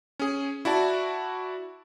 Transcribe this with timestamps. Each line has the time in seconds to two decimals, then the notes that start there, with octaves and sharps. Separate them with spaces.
0.19 C#4 G#4
0.65 E4 F#4 D5 A5